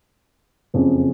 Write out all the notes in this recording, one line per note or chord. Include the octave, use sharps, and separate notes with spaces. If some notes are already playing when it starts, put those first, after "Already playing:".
F#1 F2 C#3